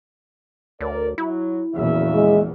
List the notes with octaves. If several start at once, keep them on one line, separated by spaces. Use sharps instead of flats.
D2 A#4 C#5 D5
F#3 E4
A#1 E2 C#3 F#3 E5
G#3